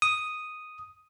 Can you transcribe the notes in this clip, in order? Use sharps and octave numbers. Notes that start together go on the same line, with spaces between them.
D#6